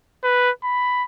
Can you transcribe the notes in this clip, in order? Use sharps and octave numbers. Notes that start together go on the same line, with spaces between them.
B4
B5